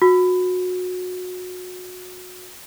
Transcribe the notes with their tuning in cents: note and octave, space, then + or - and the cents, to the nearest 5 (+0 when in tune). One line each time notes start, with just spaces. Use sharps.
F#4 -25